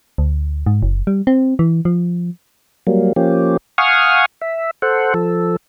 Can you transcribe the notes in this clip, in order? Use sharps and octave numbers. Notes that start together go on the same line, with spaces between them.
D2
G#2
F#1
G3
C4
E3
F3
F#3 G3 A#3
F3 A#3 C#4 G4
F5 F#5 G#5 C#6 D#6 F6
E5
A4 C5 F#5
F3 A4